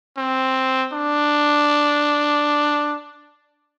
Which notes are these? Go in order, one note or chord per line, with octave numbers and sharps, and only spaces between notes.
C4
D4